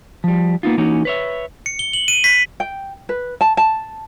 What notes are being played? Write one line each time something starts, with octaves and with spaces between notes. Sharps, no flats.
F3 G3
A#3 B3 D#4 F4
E3 A#3 C#4 D#4 F#4
B4 C#5 E5
C#7
G7
F#7
D#7
B6
G5
B4
A5
A5